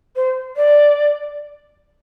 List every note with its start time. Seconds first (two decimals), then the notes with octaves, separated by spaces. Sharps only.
0.16 C5
0.56 D5